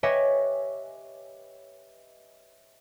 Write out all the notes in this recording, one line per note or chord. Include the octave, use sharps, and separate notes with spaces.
G4 B4 C#5 D#5 E5 G#5